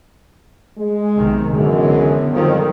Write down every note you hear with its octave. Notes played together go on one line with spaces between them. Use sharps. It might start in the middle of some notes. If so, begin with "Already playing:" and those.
G#3
B1 C3 D#3
F#2 D3 E3 G#3 B3
F2 D#3 F#3 G3